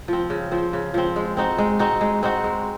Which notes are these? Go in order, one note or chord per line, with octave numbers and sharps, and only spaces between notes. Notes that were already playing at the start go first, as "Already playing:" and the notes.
F3 C4
C#3
F3 C4
C#3
F3 C4
G#3
C4 D#4 F#4
G#3
C4 D#4 F#4
G#3
C4 D#4 F#4
G#3